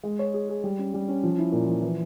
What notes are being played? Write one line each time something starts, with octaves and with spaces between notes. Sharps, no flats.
G#3
C#5
G#4
G#4
G3
C#4
G3
C#4
F3
E4
A#2
F3
E3